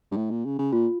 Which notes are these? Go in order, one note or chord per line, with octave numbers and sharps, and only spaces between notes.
G2
A2
A#2
C#3
C#3
A#2 F4